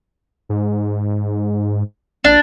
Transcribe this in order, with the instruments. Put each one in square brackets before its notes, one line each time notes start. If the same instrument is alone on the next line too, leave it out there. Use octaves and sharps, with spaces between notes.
[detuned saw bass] G#2
[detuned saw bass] A#1 [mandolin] D4